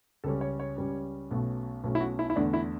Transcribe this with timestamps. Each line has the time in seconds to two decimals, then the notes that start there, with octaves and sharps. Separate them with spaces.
0.24 C#2 C#3 G3 C#4 A4
0.41 C#5
0.60 C#5
0.76 C#2 C#3 G3 C#4
1.31 B1 B2 A3 C#4
1.83 B1 B2 A3 C#4
1.95 E4
2.00 F#4
2.19 E4
2.30 E4
2.36 E2 D3 A3 D4
2.53 E4